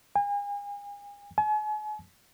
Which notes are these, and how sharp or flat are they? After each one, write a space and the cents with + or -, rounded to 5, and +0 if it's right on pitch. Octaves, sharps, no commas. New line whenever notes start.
G#5 -40
G#5 +40